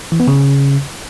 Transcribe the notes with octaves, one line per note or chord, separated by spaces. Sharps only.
E3
B3
C#3